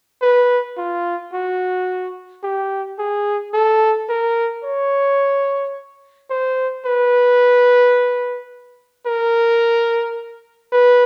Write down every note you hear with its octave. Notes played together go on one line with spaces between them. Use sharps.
B4
F4
F#4
G4
G#4
A4
A#4
C#5
C5
B4
A#4
B4